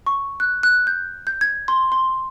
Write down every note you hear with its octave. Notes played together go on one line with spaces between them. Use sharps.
C#6
F#6
F#6
G6
G6
G#6
C6
C6